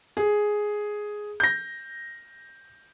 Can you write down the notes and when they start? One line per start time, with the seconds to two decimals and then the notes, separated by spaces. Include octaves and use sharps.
0.17 G#4
1.40 G6 A#6